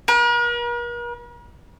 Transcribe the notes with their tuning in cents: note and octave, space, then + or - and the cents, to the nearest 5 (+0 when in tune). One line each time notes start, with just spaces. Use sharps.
A#4 +45